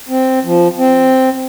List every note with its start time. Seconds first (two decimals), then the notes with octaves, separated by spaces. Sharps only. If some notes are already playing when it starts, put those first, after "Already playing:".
0.09 C4
0.44 F3
0.77 C4